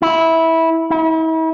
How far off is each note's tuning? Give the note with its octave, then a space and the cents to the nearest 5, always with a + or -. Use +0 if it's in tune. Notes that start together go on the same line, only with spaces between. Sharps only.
E4 -15
E4 -40